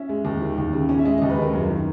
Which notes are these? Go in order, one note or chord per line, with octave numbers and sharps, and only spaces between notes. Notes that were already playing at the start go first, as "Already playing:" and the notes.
Already playing: C#4 E5
G#3
D#2
D#3
D#2
C#3
C#4
E5
G#3 D#5
D#2 D#5
B4
C#3 A#4
F#2
D#3